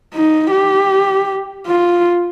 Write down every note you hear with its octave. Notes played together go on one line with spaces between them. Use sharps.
D#4
G4
F4